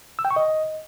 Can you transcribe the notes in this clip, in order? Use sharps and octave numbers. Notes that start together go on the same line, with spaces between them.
E6
G5
C#6
D#5